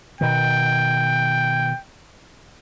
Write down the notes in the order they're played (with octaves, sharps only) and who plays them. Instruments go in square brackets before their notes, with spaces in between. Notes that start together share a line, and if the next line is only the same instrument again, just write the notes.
[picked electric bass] B2 D#3 [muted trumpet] G5